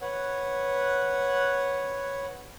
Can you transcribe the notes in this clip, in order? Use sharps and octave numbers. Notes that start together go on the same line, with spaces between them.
B4 C#5 F#5